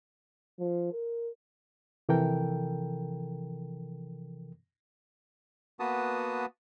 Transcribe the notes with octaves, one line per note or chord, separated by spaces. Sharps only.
F3
A#4
C3 E3 F3 A4 A#4 G5
A#3 B3 F#4 B4 A5 D#6